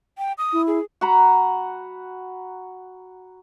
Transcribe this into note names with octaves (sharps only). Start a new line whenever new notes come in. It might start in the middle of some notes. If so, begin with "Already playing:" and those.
G5
D#6
E4
G#4
F#4 F#5 A#5 B5